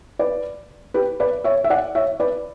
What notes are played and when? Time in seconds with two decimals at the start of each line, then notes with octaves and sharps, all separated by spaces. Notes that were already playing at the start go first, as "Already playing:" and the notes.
0.19 B4 D5
0.94 G4 B4
1.20 B4 D5
1.44 C#5 E5
1.64 E5
1.70 D5 F#5
1.95 C#5 E5
2.20 B4 D5